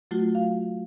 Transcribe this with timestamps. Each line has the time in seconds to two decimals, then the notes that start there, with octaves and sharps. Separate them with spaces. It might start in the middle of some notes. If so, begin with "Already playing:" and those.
0.11 F#3 A3 F4 F#4
0.35 F5